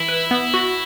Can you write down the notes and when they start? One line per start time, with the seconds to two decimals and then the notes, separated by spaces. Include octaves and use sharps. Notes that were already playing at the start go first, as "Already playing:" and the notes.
Already playing: E3 E4
0.09 B4
0.31 B3
0.54 F#4